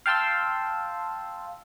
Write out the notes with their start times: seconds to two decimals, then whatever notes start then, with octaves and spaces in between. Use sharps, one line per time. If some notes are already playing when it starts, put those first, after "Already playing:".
0.06 F5 G5 A5 C6 E6